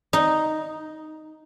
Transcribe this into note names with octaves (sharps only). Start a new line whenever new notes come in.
D#4